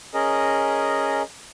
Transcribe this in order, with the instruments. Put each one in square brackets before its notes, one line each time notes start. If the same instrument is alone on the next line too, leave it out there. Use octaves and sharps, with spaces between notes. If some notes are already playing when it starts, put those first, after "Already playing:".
[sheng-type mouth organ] C#4 G#4 A#4 D#5